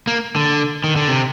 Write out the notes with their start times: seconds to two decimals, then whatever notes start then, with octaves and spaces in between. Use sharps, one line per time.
0.07 A#3
0.36 D3
0.84 D#3
0.96 D3
1.08 C3